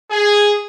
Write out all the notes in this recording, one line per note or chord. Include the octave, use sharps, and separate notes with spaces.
G#4